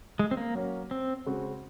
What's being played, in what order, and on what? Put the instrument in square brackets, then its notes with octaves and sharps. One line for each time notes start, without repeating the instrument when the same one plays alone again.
[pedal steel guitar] G#3
C4
A#3
[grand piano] F#3 A#3 C#4
[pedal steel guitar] C4
[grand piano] C#3 G#3 C4 F#4